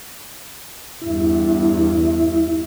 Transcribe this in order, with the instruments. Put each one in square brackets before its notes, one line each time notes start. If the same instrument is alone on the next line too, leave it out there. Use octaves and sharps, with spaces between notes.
[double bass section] E2 G2 [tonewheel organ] E4